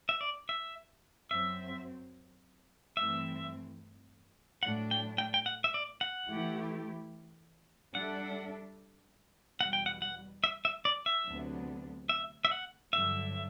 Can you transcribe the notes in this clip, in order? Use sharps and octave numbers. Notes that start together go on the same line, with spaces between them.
E5
D5
E5
F#2 F#3 C4 E5
G2 E3 A3 C4 E5
A2 F#3 A3 D4 F#5
G5
G5
G5
F#5
E5
D5
F#5
E3 A3 E4 G4
G3 D4 A4 E5 F#5
E2 B2 G3 F#5
G5
F#5
F#5
E5
E5
D5
E5
D2 C3 F#3 B3 D4
E5
E5
F#5
G2 D3 F#3 E5